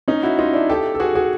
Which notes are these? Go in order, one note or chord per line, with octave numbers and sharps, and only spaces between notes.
C#4 D#4
E4 F#4
D#4 F4
D4 E4
G4 A4
A4
F#4 G#4
F#4 G#4